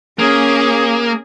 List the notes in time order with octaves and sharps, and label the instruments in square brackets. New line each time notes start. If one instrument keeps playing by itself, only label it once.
[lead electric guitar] A#3 [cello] C#4 [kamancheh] G#4